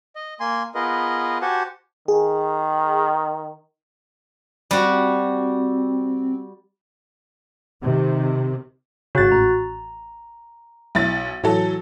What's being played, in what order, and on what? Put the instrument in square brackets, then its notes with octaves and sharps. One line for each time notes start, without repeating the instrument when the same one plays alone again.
[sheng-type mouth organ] D#5
A#3 G#5 C6
B3 F4 G#4 A#4 B4 D#5
F#4 G4 C5 F#5 G#5 A5
[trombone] D#3 [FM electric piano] G#4
[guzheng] G3 F#4 [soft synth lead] C4
[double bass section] C3 D#3
[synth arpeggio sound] G#1 C#3 [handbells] F#4 F#6 A6
[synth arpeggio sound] A1 [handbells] A#5
[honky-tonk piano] B1 E4 A6
[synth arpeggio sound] A2 [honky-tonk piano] E3 F#3 A4